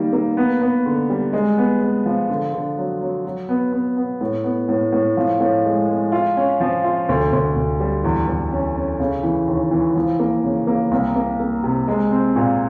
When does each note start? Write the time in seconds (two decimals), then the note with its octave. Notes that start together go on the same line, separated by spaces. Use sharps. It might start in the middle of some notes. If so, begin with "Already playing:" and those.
Already playing: D#3 G3 A#3
0.13 A#3
0.37 B3
0.62 B3
0.86 D3
1.10 G3
1.33 G#3
1.58 B3
1.81 G#3
2.06 F3
2.29 D3
2.54 D3
2.78 F#3
3.01 F#3
3.25 F#3
3.49 B3
3.72 B3
3.97 B3
4.21 A2
4.44 B3
4.68 A2
4.92 A2
5.17 F3
5.40 A2
5.65 G#3
5.89 G#3
6.12 F4
6.37 C#4
6.60 F3
6.84 F4
7.09 D2
7.33 D2
7.56 D2
7.80 G3
8.04 E2
8.28 E2
8.52 C#4
8.76 C#4
9.00 C#3
9.23 E3
9.48 D#2
9.71 E3
9.96 F3
10.20 A#3
10.44 C#3
10.67 A#3
10.92 C2
11.16 A#3
11.40 A#3
11.63 C3
11.88 G#3
12.11 C4
12.36 A#2